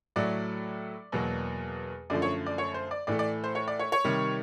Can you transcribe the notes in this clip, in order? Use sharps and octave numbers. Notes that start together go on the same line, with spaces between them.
A2 F#3 A3 D5
E2 B2 F#3 A#3
F#2 D3 F3 A3 D5
C#5
D5
C#5
C5
D5
A2 E3 A3 D5
D5
C5
C#5
D5
C#5
C#5
C3 D#3 G3